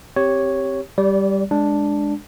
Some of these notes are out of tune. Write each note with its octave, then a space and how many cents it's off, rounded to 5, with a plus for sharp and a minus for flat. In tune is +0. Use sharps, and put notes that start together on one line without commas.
C4 +10 G4 +0 C#5 +0
G3 +0 D5 -30
G#3 +0 D4 +0